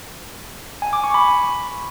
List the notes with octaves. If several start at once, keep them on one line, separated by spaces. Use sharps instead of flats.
G#5
D6
C#6
B5